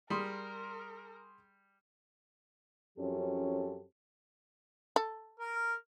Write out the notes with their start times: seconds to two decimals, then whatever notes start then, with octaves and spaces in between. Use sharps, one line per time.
0.10 G3 G#4 A#4 C6 D#6
2.98 F#2 F3 C4 C#4 G4 A4
4.96 A4
5.40 A#4 F6